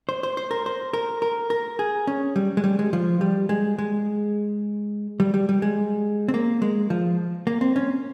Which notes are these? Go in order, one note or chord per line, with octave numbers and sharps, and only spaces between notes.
C5
C5
C5
A#4
C5
A#4
A#4
A#4
G#4
C#4
G3
G#3
G3
G#3
F3
G3
G#3
G#3
G3
G3
G3
G#3
C4
A#3
G#3
F3
A#3
C4
C#4